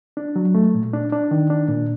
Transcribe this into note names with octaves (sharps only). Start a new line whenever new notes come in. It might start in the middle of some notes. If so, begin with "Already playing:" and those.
D4
F#3
A3
A#2
D4
D4
D#3
D4
A#2